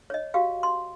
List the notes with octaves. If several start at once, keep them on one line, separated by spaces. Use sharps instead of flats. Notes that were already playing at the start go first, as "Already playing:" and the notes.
C#5 D#5
F#4 G4 F5
C6